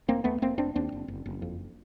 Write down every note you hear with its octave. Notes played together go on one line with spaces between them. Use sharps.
F1 A#3 C4
D#2 A3 B3
F1 A#3 C4
F1 C4 D4
D#2 C4 D4
F#1
F#1
F#1
F2